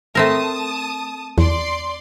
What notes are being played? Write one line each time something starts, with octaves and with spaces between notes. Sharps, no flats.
A3 C4 A#4 A5 D#6
E2 D5 C6